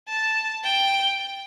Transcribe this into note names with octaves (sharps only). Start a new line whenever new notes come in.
A5
G5